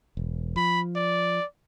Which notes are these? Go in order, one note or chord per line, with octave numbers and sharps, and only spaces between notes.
E1
F3 B5
D5